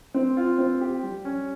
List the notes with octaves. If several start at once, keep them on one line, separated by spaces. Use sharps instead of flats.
C4
F4
C4
G4
G3
C#4